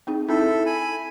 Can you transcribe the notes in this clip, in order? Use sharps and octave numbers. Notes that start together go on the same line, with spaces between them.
C4 D#4 G#4
C4 D#4 E4 A4 E5
G#5 B5